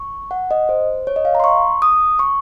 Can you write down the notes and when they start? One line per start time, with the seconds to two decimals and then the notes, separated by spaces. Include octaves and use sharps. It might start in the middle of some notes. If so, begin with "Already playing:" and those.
Already playing: C#6
0.31 F#5
0.51 D#5
0.69 C5
1.07 C#5
1.16 D#5
1.25 F5
1.35 A#5
1.40 C6
1.44 C#6
1.82 D#6
2.19 C#6